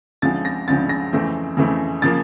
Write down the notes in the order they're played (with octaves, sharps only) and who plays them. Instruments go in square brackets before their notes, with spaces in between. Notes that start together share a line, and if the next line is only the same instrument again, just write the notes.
[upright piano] D2 C#3 F3 G#3 C4 A6
A#6
D2 C#3 F3 G#3 C4 A6
A#6
F2 C#3 E3 A3 C4
F2 C#3 E3 A3 C4
C#3 F3 A#3 A6